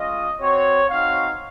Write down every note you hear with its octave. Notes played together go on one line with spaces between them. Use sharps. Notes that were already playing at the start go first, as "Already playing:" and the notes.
Already playing: G#3 C#4 F4 D#5
C4 F#4 C#5
C4 D#4 F#4 F5